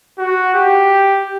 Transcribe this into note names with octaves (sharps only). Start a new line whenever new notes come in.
F#4
G4